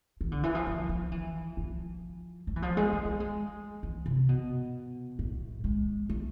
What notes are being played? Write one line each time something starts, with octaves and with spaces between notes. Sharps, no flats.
E3
D3
E3
F3
F3
F3
E3
F3
A3
E3
F3
G#3
G#3
A3
G#3
E3
C3
B2
A2
G#3
A3